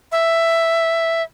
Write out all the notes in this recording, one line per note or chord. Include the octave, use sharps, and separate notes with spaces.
E5